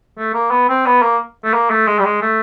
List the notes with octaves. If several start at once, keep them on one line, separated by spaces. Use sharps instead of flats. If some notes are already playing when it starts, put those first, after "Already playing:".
A3
A#3
B3
C4
B3
A#3
A3
A#3
A3
G#3
G3
G#3
A3